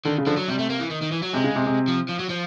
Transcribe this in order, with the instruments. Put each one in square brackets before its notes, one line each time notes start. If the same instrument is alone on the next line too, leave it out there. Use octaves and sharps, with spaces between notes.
[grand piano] D3 [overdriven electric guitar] D#3
[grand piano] C#3
[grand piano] D3 [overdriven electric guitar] F3
[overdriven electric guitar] F#3
[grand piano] C3 [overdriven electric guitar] G3
[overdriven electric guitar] A3
A#3
E3
D#3
D#3
E3
F#3
[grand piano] C3 [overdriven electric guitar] G#3
[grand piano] C#3
C3
C3
[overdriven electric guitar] F3
F3
F#3
F3